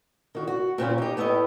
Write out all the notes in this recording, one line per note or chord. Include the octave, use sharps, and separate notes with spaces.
D#3 F#4
F#4
A#2 C4 C#4 F4
D#4 G4
A2 B3 E4 G4 D#5